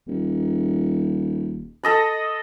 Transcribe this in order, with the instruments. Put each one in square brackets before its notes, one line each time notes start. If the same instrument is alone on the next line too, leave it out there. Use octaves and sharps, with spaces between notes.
[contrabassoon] D#1
[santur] A4 D#5 B5